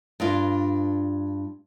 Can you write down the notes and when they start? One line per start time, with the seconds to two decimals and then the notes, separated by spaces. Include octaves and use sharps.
0.20 G2 D4 F4